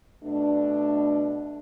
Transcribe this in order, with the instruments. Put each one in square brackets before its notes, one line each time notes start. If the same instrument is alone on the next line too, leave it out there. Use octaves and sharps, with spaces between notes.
[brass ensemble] B2 A3 D4